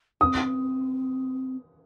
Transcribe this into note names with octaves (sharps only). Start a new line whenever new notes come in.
C4 D4 D#6